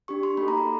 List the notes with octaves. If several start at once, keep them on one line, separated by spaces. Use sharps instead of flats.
D4 G4 C#6
C6
A#3 D#4 F#4 A4 B5
A#5
C6